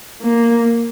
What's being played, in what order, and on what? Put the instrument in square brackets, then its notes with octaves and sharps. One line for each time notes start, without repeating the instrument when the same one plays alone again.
[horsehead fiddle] A#3